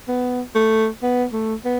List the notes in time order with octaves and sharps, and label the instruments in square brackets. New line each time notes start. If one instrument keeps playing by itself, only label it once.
[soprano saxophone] B3
A3
B3
A3
B3